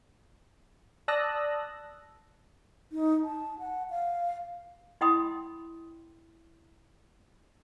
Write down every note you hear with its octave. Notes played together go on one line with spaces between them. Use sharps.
D5 A5 D#6 E6 F#6 A#6
D#4
A5
F#5
F5
E4 D#5 G5 B5 C6 D#6